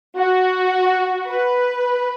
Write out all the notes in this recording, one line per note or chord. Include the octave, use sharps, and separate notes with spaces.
F#4
B4